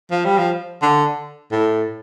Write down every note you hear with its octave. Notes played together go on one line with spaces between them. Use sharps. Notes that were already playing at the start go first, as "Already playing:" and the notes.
F3
G3
F3
D3
A2